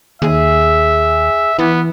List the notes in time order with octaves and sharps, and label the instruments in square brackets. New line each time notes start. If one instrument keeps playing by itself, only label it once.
[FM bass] D#2 [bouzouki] G#4 [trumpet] E5
[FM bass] E3 [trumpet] B3